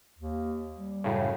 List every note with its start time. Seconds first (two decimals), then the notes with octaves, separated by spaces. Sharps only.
0.18 D#2
0.76 G3
1.04 F#2 A2 C#3